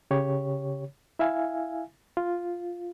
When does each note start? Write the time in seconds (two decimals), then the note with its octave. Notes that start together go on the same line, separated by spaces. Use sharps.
0.11 C#3 G4 C#5
1.19 E4 E5 F5 G#5
2.17 F4